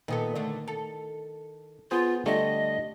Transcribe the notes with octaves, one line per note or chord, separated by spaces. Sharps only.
A#2 D#3 B3 A4
D3 A3
A4
B3 F4 G#4 C5
D3 G3 A3 D#5